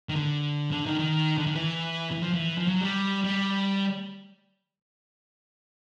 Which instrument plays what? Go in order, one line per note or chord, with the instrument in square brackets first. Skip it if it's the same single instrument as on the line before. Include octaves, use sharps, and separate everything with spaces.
[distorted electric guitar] D#3
D3
D3
D#3
D#3
D3
D#3
E3
E3
F3
E3
F3
F#3
G3
G3